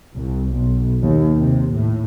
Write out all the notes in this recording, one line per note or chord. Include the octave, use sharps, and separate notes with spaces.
C2
B1
D#2
C3
A2